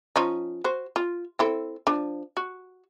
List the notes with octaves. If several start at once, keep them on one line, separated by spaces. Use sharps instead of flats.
F3 C#4 D#4
F#4 C5
F4
C4 E4 A4
F3 D4
F#4